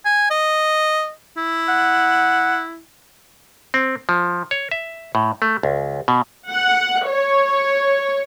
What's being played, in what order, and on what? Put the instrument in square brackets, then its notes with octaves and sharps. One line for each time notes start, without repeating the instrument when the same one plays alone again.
[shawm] G#5
D#5
E4
[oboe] F#5
[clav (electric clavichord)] C4
F3
C#5
E5
A2
A3
C#2
B2
[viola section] F#5
C#5